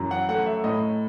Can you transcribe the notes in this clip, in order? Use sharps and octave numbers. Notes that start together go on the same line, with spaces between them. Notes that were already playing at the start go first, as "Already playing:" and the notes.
Already playing: F#2 E3
F#5
A3 F#5
E5
A2 D#5